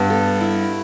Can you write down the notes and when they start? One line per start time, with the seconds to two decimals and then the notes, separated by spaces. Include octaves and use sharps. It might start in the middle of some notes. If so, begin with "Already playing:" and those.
Already playing: G2 B3
0.10 A4
0.41 E4